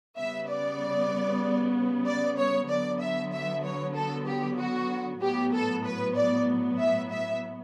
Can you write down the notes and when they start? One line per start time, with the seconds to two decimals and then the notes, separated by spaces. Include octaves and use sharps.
0.17 C#3 G3 B3 E5
0.48 D5
2.06 D5
2.37 C#5
2.69 D3 F#3 B3 D5
3.00 E5
3.33 E5
3.64 C#5
3.95 A4
4.27 G4
4.58 F#4
5.21 A2 F#3 B3 G4
5.53 A4
5.84 B4
6.15 D5
6.79 E5
7.11 E5